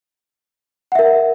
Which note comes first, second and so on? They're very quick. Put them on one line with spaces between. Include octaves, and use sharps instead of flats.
F#5 E5 A#4